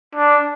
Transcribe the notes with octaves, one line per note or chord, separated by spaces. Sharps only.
D4